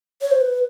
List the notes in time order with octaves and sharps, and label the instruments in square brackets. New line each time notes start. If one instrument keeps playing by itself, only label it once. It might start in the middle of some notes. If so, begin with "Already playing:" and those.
[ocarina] C#5
C5
B4